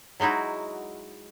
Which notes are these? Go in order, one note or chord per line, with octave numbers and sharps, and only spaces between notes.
F#3 G#3 D#4 E4 F#4